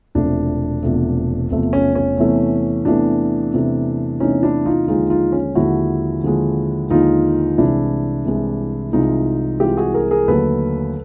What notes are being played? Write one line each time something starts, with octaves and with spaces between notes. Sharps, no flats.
E1 E2 C3 F3 A3 D4
E1 E2 C3 F3 A3
E1 E2 C3 F3 A3
C#4
C#4
E2 C3 E3 A3
E2 C3 E3 A3 D4
E2 C3 E3 A3
E2 C3 E3 A3 C#4 D#4
D4 E4
D#4 F4
D#2 D3 F3 G#3 D#4 F4
D#4 F4
C#4
D#2 D3 F3 G#3 E4 F#4
D#2 D3 F3 G#3
D#2 D3 F3 G#3 D#4 F4
C2 C3 E3 G#3 D4 E4
C2 C3 E3 G#3
C2 C3 E3 G#3 D#4 F4
C2 C3 E3 G#3 F4 G4
F#4 G#4
G#4 A#4
G#4 A#4
D#2 D3 F#3 A3 A4 B4